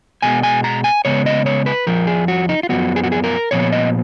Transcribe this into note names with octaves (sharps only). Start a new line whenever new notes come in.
B2 G#3 B3 G#5
G#5
A#5
G#5
C#3 G#3 B3 C#5
D#5
C#5
B4
F2 F3 A#4
G#4
F#4
D#4
F4
F#2 F3 B3 F#4
G#4
F#4
G#4
A#4
A#2 F3 B3 C#5
D#5